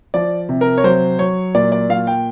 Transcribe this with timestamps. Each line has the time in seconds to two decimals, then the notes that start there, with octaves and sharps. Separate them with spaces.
0.14 F3 D5
0.49 C3
0.61 A#4
0.78 C#5
0.84 F#3 C5
1.19 F#3 C#5
1.55 A#2 D5
1.72 D5
1.89 A#2 F5
2.07 G5